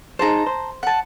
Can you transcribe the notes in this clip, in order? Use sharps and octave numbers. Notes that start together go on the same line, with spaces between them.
D#4 G#4 C5 A5 A#5
C5
F#5 A5